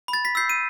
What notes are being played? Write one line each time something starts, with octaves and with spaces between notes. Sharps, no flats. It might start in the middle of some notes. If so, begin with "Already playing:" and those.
B5
A6
B6
E6 G6 C7
D#7